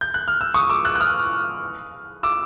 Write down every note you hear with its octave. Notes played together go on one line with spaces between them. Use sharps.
G6
F#6
F6
E6
C#6 D#6
D6 E6
E6 F#6
F#6
D#6 F6
D6 E6